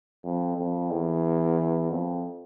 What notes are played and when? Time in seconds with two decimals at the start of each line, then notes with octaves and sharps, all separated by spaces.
0.24 F2
0.58 F2
0.91 E2
1.91 F2